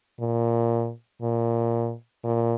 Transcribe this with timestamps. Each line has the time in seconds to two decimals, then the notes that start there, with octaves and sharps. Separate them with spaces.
0.20 A#2
1.22 A#2
2.24 A#2